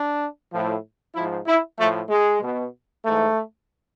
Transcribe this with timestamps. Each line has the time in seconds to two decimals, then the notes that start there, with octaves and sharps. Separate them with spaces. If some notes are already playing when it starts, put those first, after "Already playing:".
Already playing: D4
0.53 A2 F3
1.15 G#2 F3 E4
1.47 E4
1.79 A2 F3 A3
2.10 G#3
2.42 B2
3.05 G#2 E3 A3